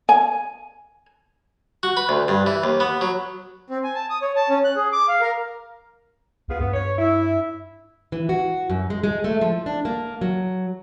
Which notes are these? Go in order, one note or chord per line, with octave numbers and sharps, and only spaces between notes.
G#5
F#4
B4
D2
G2
E3
D#2
B3
F#3
C4
G#5
A5
D#6
C#5
A5
C#4
F#6
G#4
D6
F5
A#4
C#2 B3 F4 G#4
G2 B3
C#5
E4
E3
F#4
F#2
G#3
G#3
A3
F3
D4
A#3
F#3